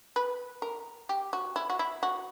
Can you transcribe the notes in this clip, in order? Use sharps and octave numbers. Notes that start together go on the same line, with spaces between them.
B4
A#4
G4
F#4
E4
F#4
E4
F#4